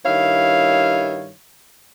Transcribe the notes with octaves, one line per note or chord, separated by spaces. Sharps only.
G2 D#3 E4 C#5 F5